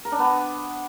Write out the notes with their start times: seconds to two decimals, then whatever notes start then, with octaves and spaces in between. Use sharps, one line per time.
0.05 A#4
0.12 D4
0.19 B3